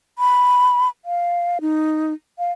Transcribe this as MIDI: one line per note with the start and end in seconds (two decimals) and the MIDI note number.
0.19 0.88 83
1.05 1.58 77
1.61 2.13 63
2.39 2.52 77